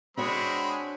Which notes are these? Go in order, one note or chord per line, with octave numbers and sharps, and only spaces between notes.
G#3 C4 D4 F#4 C#5 B5